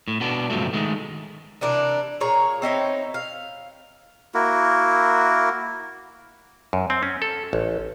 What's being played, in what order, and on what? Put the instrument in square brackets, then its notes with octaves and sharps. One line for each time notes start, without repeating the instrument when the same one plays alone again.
[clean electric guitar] A2
B2 B3 D4
C#2 G2 B2 F3 F#3 A3
D#3 G#3 A3
[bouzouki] C3 E3 D4 A#4
A#2 G#4 C#5 A#5
C4 D#4 E4 C#5
F5
[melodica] A#3 E4 F#4 A#4
[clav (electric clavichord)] F#2
C4
C#4
A4
A1